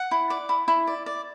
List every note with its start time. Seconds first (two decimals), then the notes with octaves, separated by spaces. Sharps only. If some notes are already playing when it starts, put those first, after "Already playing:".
Already playing: F#5
0.11 E4
0.30 D5
0.49 E4
0.68 E4
0.87 D5
1.06 D5